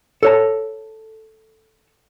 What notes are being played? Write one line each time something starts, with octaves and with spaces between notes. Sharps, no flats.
A4 C#5 A5